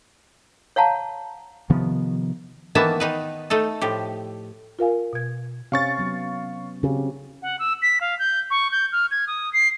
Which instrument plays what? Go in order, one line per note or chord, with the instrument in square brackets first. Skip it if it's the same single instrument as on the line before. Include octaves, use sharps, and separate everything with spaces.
[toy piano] C#5 F5 F#5 A5 A#5
[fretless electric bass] C3 D#3 F3 B3
[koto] D#3 E3 A#3 B3 E5 A5
D#3 D#4 B4
A3 D#4 A4
A2 F3 G4
[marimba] F4 A#4 F5 G#5
B2 G#6
[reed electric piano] C3 C#4 [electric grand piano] F5 C#6 A6
[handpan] F#3 B3
[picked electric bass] C#3 [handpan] C4 F#4 G4
[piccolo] F#5
E6
B6
F5
G6
C#6
G6
F6
G#6
D#6
C7